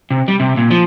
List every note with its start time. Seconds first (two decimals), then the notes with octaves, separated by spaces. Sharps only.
0.10 C3
0.28 G3
0.40 C3
0.57 A#2
0.71 F3